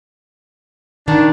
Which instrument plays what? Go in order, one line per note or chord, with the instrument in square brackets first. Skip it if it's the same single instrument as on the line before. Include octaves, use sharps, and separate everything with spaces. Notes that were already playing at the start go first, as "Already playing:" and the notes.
[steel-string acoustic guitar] D#3 [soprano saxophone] D4